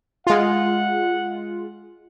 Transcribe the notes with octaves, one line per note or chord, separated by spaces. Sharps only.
G#3 F4 F#5